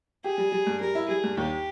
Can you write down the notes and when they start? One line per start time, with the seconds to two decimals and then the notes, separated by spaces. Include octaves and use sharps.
0.24 G4 G#4
0.38 G3
0.52 G3
0.67 G2
0.80 G3 A#4
0.95 E4
1.08 G3 G#4
1.24 G2
1.37 D#2 G4